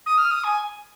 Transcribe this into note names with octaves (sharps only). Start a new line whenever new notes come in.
D#6
F6
D#6
G#5